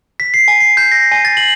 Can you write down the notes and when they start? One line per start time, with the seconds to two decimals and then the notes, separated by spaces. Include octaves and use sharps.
0.20 B6
0.34 C7
0.48 G#5
0.60 C7
0.77 G6
0.92 A#6
1.12 G#5
1.25 A6
1.37 F#7